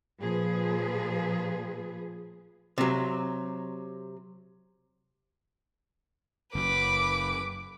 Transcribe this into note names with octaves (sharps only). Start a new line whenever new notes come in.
A#2 F3 G#4 B4
C3 F#3
F#1 B4 D6